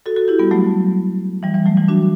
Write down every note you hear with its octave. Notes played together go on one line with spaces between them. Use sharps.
F#4 A4
F#4 A4
E4 G4
G3 B3
F#3 A3
E3 G3
E3 G3
F#3 A3
E3 G3
D4 F#4